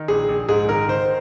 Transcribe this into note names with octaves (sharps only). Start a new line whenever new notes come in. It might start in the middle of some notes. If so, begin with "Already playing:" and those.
Already playing: D#3
A#1 G#4
A#1
G#2 G#4
D#3 A#4
D#3 C5